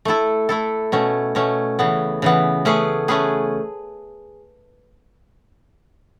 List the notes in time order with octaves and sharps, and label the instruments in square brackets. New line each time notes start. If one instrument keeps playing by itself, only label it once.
[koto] A3 E4 A4
A3 E4 A4
B2 A3 C#4
B2 A3 C#4
C#3 E3 B3
C#3 E3 B3
A3 C#4 G#4 B4
A3 C#4 G#4 B4